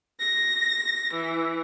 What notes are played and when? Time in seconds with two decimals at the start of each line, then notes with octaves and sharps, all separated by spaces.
0.19 A#6
1.13 E3